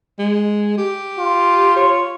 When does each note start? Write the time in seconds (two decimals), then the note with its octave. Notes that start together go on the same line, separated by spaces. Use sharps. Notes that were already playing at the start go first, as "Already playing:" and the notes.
0.19 G#3
0.78 G4
1.19 F4
1.76 C#5